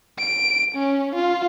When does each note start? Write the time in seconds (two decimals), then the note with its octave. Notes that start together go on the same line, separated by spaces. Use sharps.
0.19 D7
0.75 C#4
1.16 F4